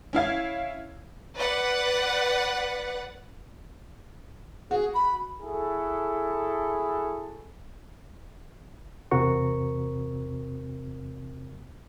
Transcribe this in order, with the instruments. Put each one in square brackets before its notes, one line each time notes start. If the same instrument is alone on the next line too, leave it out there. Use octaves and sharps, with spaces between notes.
[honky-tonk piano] C#4 E4 F5 G#6
[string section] B4 D5 F#5
[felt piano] F#4 [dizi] G#4
[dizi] B5
[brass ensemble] E4 F#4 G#4 A4
[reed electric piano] E2 C3 C4 F#4 A#4 C#6